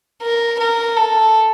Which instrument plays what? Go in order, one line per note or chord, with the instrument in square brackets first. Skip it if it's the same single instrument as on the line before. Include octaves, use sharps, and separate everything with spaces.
[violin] A#4
A#4
A4